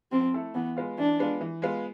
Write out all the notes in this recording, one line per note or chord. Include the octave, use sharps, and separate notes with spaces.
F3 C4
A3 E4 A4
E3 B3
G#3 B3 F4
E3 D4
G#3 B3 F4
E3
G#3 B3 F4